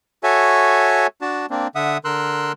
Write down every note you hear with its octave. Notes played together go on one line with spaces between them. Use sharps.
F#4 A4 C#5 E5 G#5
D4 F#4 A5
A#3 C4 D4
D3 E5 F#5 D#6
D3 A#4 C6 E6 F#6